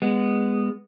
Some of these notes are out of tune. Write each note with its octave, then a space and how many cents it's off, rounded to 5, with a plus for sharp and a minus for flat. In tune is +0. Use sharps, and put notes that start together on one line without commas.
G#3 -20 B3 +0